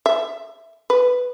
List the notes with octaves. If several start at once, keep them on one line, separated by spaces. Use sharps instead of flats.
E5
B4